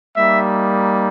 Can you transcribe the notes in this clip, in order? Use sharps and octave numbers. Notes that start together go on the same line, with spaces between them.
G3 A#3 D#4 E5